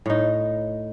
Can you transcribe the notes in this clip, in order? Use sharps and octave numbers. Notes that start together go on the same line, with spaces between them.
A2 D#4